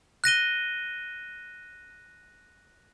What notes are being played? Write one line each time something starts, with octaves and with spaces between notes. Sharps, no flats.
F#6 A#6 D#7 G7